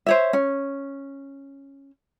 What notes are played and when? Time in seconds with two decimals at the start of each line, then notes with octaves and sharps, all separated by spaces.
0.06 C5 C#5 E5
0.33 C#4